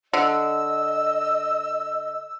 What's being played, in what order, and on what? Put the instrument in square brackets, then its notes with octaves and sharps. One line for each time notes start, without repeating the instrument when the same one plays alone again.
[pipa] D3 [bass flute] D#5 [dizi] E6